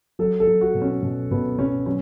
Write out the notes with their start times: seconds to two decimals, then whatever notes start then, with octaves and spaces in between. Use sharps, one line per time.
0.19 F#3 A4
0.40 A4
0.47 F#3
0.61 F#4
0.74 B2
0.82 C#4
1.02 B2
1.31 B2 B3
1.58 B2 C#4
1.86 F#3 C#4